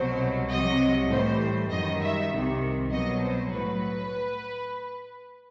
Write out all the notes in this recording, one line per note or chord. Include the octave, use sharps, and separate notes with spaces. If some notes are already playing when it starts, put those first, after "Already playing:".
Already playing: C2 B2 F#3 C5
C2 C3 F#3 D#5
A2 E3 G3 C5
F#2 D#3 G3 D#5
E5
C2 C3 D#3
C2 B2 F#3 D#5
C5
A2 F#3 B4